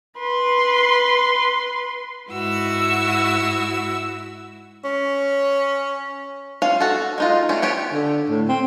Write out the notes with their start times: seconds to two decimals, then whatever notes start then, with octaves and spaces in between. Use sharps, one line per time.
0.20 B4 C6
2.32 G#2 E4 F#4 E6
4.85 C#4
6.62 C#4 F4 F5
6.80 F#4 A4
7.18 G#3 D#4 F4
7.49 G3 A3 C4 C#4
7.62 B3 G4 C#5
7.94 D3
8.30 A2
8.48 C4